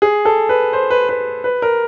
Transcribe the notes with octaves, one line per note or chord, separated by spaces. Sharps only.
G#4
A4
B4
C5
B4
B4
B4
A#4